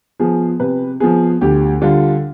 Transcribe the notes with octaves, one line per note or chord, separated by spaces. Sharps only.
F3 B3 G#4
C3 B4
F3 B3 G#4
D2 G4
D3 G3 D4 F4